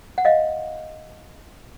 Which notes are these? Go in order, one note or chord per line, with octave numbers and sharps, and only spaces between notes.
F#5
D#5 F5